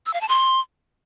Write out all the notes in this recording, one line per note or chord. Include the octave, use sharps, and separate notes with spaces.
E6
F5
A5
C6